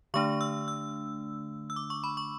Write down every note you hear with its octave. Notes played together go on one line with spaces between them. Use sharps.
D3 A3 D4 C#6
E6
E6
E6
D6
C#6
B5
C#6